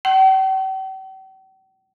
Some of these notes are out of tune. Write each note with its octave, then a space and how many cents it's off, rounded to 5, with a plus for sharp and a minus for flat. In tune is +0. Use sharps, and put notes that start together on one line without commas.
G5 -45